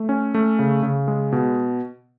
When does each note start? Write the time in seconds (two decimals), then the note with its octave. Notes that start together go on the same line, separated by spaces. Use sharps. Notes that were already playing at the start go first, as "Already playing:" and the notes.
Already playing: A3
0.09 C#4
0.34 A3
0.59 C#3
0.83 C#3
1.08 G#3
1.32 B2